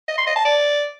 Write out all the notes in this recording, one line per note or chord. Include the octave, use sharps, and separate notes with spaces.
D#5
C6
D#5
A5
D5